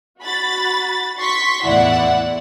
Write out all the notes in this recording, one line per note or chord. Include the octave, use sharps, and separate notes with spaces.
F#4 B5 A6
C6 C#6 B6
E2 A2 E4 D5 F#5